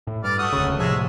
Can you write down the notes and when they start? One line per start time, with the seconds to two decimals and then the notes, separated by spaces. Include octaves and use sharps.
0.07 A2
0.24 G2 D5 F6
0.39 A3 F#4 D#6
0.53 E1 D2 C#3
0.79 A2 C3 F3 G#3 C#5 E5